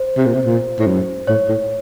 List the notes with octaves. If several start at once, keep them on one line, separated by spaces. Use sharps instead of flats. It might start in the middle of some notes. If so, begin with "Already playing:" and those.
Already playing: C5
C3
A#2
C3
A#2
A2
F#2
A2 C#5
A2